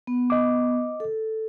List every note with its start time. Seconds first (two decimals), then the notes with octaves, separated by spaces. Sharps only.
0.07 B3
0.30 D#5 D6
1.00 A4